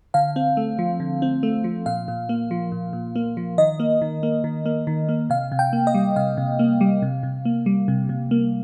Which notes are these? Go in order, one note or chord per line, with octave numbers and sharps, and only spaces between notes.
D3 F5
C4
A3
F3
D3
C4
A3
F3
A#2 F5
A#2
A#3
F3
A#2
A#2
A#3
F3
D#3 D#5
A#3
D#3
A#3
D#3
A#3
D#3
A#3
C3 F5
C3
G5
A#3
D#5
G3
C3 F5
C3
A#3
G3
C3
C3
A#3
G3
C3
C3
A#3